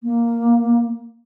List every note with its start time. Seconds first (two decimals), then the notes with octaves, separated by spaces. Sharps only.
0.03 A#3